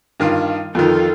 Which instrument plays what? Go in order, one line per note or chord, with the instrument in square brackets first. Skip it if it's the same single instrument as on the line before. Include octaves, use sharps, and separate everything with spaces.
[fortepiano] G2 D#3 F4
[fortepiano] F2 D#3 [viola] F4 A4